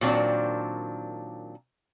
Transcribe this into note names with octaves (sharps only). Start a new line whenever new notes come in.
A#2 D#3 F#3 C4 D4